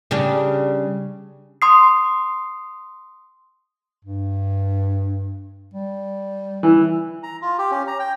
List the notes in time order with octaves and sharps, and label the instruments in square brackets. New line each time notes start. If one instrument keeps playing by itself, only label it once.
[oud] C#3 G3 D4
[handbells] C6 D#6 C7
[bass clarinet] G2
G3
[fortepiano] E3
[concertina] A#5
F4
G4
C#4
A#5
G5